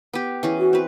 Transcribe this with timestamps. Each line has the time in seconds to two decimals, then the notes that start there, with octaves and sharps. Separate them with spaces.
0.13 B3 G4
0.43 E3 C#4 G#4
0.58 F#4
0.73 C4 B4